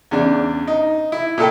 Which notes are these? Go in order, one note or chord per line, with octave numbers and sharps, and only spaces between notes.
E2 C#3 D4
D#4
E4
A#2 E4 A4 G5